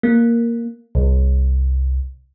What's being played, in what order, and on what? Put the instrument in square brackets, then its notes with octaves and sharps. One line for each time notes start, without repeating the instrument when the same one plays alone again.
[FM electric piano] A#3
C2